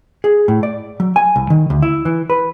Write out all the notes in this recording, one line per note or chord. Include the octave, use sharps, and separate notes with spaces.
G#4
A2
D5
F#3
G#5
C2
D#3
D2
E4
E3
B4